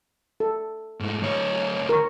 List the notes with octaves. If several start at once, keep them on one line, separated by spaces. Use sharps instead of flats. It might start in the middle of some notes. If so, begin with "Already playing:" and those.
A4
G#2 A3
D2 C#5
A#4 C#6